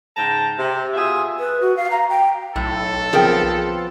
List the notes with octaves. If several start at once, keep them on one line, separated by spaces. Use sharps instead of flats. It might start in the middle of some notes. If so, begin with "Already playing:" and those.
G#2 C#3 G5 A5 A#5
C3
B2 F4 G#4 E5
B4
F#4
F5
A#5
G5
B1 A2 A4
F3 B3 C4 G#4 A#4 G5